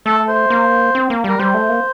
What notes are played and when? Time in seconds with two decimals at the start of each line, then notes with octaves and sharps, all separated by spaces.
0.06 A3 A4
0.28 C5
0.50 A#3
0.95 C4
1.10 A#3
1.24 G3 A#4
1.39 G3 C5
1.54 A3
1.69 A#3